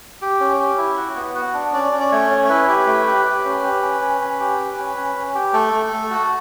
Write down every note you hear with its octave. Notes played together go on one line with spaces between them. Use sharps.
G4
C#4
G4
E4
F#4
B3
F#4
D4
C#4 D5
C#4
D5
A3 C#5
C#4
C#5
E4 B4
G4
A3
G4
G4
C#4
G4
C#4
C#4
C#4
G4
C#4
C#4
C#4
C#4
G4
A3 A4
A3
A3
F#4